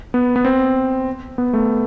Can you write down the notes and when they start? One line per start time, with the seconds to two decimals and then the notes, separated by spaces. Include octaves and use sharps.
0.14 B3
0.36 B3
0.45 C4
1.38 B3
1.53 A3